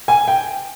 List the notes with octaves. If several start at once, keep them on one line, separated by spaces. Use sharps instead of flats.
G#5
G5